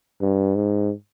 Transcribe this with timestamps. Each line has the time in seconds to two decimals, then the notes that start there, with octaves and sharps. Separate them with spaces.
0.21 G2
0.56 G#2